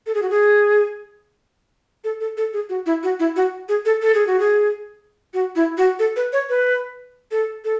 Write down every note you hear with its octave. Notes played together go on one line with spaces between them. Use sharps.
A4
G#4
F#4
G#4
A4
A4
A4
G#4
F#4
E4
F#4
E4
F#4
G#4
A4
A4
G#4
F#4
G#4
F#4
E4
F#4
A4
B4
C#5
B4
A4
A4